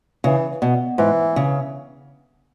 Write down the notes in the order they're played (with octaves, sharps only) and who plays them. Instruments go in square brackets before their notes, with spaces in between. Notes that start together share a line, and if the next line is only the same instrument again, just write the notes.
[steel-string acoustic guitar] C#3 [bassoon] E3
[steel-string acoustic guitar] B2
[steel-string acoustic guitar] G#2 [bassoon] E3
[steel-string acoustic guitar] C#3